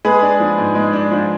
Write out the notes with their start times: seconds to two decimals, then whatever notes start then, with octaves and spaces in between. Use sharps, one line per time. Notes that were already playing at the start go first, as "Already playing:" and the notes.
0.05 G#3 G#4 B4
0.22 D4
0.40 F3
0.58 G#2
0.75 G#3
0.93 D4
1.11 F3